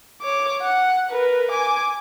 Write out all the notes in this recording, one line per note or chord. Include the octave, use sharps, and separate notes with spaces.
C#5 D6
F#5
A#4 B4
G#5 D6